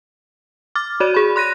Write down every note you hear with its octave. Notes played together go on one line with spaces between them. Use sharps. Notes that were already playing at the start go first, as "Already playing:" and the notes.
D6 F6 A6
F#4 C#5 D5 D#7
G#4 B5
C6 F#6 A#6 D#7